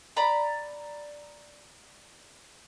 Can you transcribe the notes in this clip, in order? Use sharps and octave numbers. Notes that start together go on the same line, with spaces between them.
D5 A#5 B5